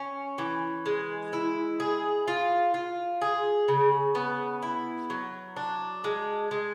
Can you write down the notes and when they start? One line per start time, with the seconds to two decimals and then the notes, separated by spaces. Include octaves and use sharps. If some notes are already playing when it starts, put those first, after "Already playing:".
Already playing: C#4
0.38 E3
0.86 G#3
1.33 E4
1.80 G#4
2.28 F4
2.74 F4
3.22 G#4
3.68 C#3
4.15 B3
4.63 E4
5.10 F#3
5.57 D4
6.04 G#3
6.51 G#3